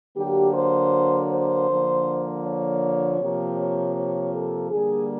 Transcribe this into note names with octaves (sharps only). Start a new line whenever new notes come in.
D3 F#3 A#3 G4
C5
C5
D3 F3 A#3
C#5
C3 F3 A#3
C#5
C#5
A4
D3 G3 A#3 G#4